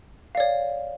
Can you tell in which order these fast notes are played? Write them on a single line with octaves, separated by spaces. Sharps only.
F5 D5 C#5